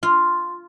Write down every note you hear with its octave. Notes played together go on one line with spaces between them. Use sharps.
F4